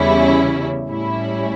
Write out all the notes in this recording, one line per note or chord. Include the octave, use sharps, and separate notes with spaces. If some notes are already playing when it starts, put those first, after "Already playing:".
Already playing: E2 C#3 G3 C#4 E4
A2 G3 C#4 E4